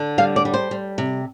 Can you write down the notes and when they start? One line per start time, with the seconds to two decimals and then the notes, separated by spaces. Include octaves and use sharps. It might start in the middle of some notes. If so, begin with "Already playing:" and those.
Already playing: D3
0.18 G3 F5
0.36 D5
0.45 G3
0.54 C5
0.71 G3
0.98 C3